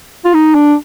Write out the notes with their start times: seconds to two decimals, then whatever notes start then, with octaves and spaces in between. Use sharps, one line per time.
0.25 F4
0.34 D#4
0.55 D4